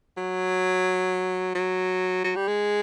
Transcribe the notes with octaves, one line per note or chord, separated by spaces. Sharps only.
F#3
F#3
F#3
G3
G#3